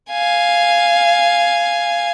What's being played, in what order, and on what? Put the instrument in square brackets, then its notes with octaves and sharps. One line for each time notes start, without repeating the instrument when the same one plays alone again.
[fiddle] F5 G#5